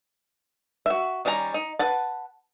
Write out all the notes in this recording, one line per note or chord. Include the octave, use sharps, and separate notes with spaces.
F#4 E5
D#3 G3 C#4 F#4 A#5
D#4
B4 F#5 A5